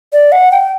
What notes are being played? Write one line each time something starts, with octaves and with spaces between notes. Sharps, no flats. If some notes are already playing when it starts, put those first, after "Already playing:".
D5
F#5
G5